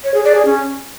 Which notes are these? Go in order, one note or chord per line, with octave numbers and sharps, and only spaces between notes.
C#5
G#4
D5
G#4
C#4